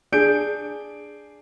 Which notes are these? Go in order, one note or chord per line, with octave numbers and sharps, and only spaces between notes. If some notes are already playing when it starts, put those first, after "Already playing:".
D4 G#4 G6 D7